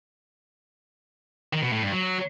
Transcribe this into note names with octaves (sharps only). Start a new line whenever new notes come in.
D#3
B2
A2
G2
F#3